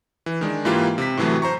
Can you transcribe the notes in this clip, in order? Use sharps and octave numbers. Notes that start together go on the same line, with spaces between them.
E3
D#3 G#3 D4
G#2 E3 A#3 E4 F4 G4
C3 B6
A2 C3 E3 F#3 A3
C5 A#5 C#6